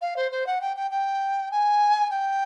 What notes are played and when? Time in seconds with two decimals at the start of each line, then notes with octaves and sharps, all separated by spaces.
0.01 F5
0.16 C5
0.31 C5
0.46 F#5
0.61 G5
0.76 G5
0.90 G5
1.51 G#5
2.10 G5